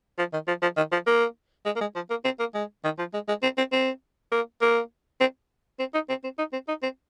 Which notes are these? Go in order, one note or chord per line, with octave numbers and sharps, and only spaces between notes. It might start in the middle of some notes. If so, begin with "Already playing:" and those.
F3
D#3
F3
F3
D#3
F3
A#3
G#3
A#3
G#3
F3
A#3
C4
A#3
G#3
D#3
F3
G#3
G#3
C4
C4
C4
A#3
A#3
C4
C4
D#4
C4
C4
D#4
C4
D#4
C4